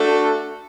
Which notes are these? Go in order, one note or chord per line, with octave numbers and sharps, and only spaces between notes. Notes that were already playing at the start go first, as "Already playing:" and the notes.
Already playing: A3 D4 F#4 A4